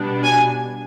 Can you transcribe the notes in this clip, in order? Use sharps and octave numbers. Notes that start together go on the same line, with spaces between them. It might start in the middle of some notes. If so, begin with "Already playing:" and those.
Already playing: B2 G3 B3 D4
G#5